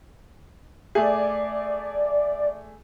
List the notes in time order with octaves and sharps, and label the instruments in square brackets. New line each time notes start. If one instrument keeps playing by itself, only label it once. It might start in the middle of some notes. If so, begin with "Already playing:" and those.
[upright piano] A3 G#4 [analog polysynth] D5